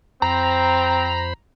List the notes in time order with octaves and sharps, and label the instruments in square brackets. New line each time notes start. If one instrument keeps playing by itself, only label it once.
[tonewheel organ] F2 C5 B5 [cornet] C4 [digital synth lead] A#5